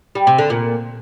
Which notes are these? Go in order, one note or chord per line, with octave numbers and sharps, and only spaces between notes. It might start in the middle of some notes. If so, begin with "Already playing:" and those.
G3
C3
D3
A#2